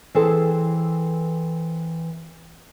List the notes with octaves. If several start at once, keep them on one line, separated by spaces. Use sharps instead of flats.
E3 C4 G#4 A4 C5